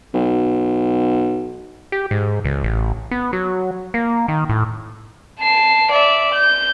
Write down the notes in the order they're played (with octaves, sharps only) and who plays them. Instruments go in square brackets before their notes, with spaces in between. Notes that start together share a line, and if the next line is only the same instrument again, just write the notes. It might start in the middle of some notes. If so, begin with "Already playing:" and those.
[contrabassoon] B1
[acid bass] G4
G#2
C#2
A1
B3
F#3
A#3
D#3
A2
[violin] A5 C7
D5 E5
G6